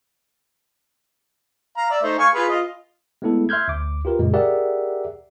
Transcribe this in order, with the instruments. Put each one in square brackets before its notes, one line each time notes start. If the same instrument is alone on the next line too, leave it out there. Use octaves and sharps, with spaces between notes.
[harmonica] F5 A#5
D5 E5
A3 D#4 C5
F5 G#5 C#6
F4 G#4 B4
F4 D#5
[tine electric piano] G#3 A3 B3 E4 A4
E5 C6 F6 G6 G#6
D2 D6
F4 G4 A#4 B4
F#2 A#2 C#3 G#3
G4 G#4 A#4 D5 E5 F#5